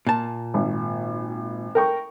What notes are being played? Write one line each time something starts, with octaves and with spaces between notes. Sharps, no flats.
A#2 A5
G#1
A#4 G5 C#6